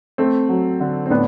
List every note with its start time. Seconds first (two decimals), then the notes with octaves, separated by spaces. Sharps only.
0.18 A3 C4
0.49 F#3
0.80 D3
1.06 C4
1.10 A2 B3 D4